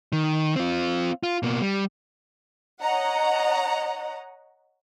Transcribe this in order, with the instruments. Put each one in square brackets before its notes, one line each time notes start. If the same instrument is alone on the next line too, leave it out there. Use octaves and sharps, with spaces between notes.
[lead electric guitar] D#3
C4 F4
F4
B2 A#3
G3
[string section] C#5 D#5 F#5 A#5